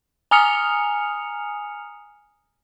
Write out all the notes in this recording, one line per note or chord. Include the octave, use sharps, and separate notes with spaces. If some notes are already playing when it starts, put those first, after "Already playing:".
G#5 A#5 D#6 F6 C#7 F7